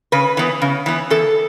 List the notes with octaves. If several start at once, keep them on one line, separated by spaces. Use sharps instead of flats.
C#3 B4
E3 B3
C#3
E3 B3
E2 A4